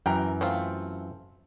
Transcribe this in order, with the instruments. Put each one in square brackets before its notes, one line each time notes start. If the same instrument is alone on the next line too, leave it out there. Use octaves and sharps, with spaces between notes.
[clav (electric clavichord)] F#2 E3 [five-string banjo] A#4 G5
[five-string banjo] A3 C4 F4